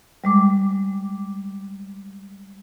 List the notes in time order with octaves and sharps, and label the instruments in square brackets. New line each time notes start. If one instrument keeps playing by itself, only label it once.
[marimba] G3 G#3 D6